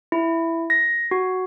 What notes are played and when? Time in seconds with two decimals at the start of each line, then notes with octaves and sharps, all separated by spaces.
0.12 E4
0.70 A#6
1.11 F#4